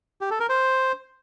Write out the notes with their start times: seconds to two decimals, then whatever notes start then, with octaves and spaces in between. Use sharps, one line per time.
0.21 G4
0.31 A4
0.40 A#4
0.49 C5